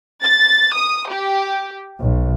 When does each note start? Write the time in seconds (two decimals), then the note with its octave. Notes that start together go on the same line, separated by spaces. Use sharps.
0.21 A6
0.73 D#6
1.08 G4
2.01 B1